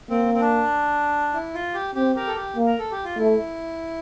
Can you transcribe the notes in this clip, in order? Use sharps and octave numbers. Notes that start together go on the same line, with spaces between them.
A#3 C4
C4
D4
E4
F4
G4
C4 G4
G4 A#4
A4
G4
A#3
A#4
A4
G4
F4
A3 E4